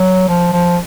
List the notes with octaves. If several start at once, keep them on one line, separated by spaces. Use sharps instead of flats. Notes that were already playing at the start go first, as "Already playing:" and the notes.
Already playing: F#3
F3
F3